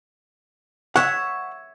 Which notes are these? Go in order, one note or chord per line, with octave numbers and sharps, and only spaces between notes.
C#5 E5 F#5